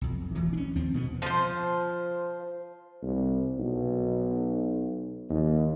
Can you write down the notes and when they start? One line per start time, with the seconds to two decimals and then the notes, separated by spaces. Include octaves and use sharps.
0.01 B1 F2
0.35 D1 E3 F#3
0.53 C#4 D4
0.75 D#2 F3 C4
0.94 B2 A#3 B3
1.22 F3 C5
3.02 C2
3.58 B1
5.30 D#2